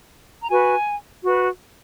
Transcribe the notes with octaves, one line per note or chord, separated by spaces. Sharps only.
A#5
F#4 B4 G#5
F#4 B4